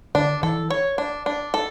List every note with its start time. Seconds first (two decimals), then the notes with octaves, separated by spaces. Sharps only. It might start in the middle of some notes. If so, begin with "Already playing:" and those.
0.15 D3 D4
0.43 E3 A4
0.70 C#5
0.98 D4
1.26 D4
1.54 A4